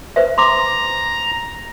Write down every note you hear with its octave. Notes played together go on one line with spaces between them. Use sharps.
B4 C5 E5
A#5 C6 D6